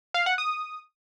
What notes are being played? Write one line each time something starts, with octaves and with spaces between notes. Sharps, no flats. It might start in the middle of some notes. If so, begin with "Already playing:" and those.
F5
F#5
D#6